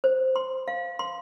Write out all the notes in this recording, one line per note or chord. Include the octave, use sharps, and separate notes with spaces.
C5
C6
F5
C6